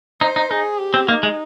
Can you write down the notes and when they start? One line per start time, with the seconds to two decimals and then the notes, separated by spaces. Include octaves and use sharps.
0.21 D#4 C5
0.36 D#4
0.51 D#4 G#4
0.79 G4
0.94 C4
1.08 A#3 D#4
1.23 G#3